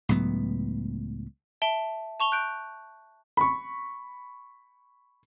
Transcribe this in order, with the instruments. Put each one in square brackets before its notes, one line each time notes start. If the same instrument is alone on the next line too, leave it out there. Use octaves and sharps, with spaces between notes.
[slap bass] C#2 A2 F#3 B3
[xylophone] E5 A5 D7 G7
A5 C#6 F7 G7
F#6 G6 D7
[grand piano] B5 C#6